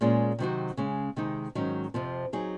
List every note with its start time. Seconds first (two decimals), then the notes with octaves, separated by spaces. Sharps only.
0.01 A#2 G#3 C#4 F4 G#4
0.39 C3 D#3 F#3 C4 F#4
0.77 C#3 G#3 C#4
1.16 C3 D#3 G#3 D#4
1.55 G#2 D#3 F#3 C#4
1.94 F2 C3 F3 C4
2.33 F#3 C4 D#4 G#4